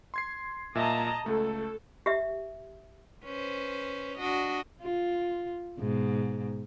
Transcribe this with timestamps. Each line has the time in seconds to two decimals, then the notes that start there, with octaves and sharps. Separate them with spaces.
0.14 C6 G#6 C7
0.75 A#2 D#5 E5 A5 A#5
1.26 C#2 A3 A4
2.06 G4 E5
3.24 C#4 B4 C5
4.18 D4 F#4 D#5
4.82 F4
5.79 G#2 B2